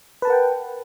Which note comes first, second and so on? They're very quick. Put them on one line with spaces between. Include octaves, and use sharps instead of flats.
B4 A5 A#4 F#5 G5